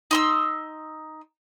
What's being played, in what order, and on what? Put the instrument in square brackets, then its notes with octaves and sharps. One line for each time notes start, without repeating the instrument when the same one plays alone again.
[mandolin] D#4 C6 E6